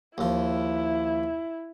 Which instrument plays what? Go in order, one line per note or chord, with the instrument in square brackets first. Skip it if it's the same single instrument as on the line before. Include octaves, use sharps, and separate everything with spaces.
[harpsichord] D#2 F3 [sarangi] E4